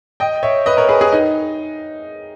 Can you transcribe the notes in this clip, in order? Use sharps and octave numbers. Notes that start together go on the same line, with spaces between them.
D#5 G5
C#5 E5
B4 D#5
A#4 C#5
G#4 B4
G#4 B4
D#4